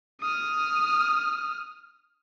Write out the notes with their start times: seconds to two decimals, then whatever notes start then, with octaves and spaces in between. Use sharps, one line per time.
0.21 D#6 F6